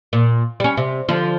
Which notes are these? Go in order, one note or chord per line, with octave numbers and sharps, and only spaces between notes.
A#2
G3 C#4
C3
D3 F3